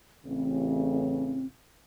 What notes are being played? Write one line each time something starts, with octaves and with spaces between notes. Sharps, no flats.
A1 C#3 C4